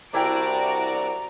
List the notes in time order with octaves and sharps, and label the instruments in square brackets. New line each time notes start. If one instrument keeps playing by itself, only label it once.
[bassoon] C2 [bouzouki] D4 E4 G5 [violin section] F#4 D5 D7 [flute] A#5